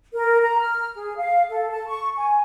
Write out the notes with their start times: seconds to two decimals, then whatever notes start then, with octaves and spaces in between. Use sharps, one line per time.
0.14 A#4
0.41 A#5
0.59 F6
0.96 G#4
1.17 F5
1.50 A4
1.70 A5
1.88 C#6
2.17 G#5